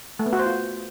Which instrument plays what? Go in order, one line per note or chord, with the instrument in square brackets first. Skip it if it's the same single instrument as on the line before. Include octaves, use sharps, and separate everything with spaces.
[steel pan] A3
B3
F#4
C5
F4